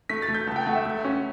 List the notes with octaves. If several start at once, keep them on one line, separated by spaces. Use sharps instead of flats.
A3 B6
A6
A3
G6
C#2 A5
G5
A3 F#5
E5
A3
C#4